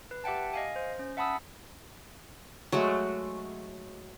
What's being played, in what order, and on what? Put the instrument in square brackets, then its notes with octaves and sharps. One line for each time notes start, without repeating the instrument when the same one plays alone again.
[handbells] B4
G4 E5 F#5 G5 A5
D#5 F5 G#5
C5
C#4
E5 F#5 A5 B5 D#6 E6
[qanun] F#3 G#3 A3 F#4